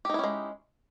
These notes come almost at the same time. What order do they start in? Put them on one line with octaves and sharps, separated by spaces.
G4 D#4 E4 C#4 G#3